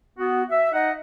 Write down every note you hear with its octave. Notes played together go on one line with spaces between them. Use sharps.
B3 F#4
E5
D#4 D#5 F#5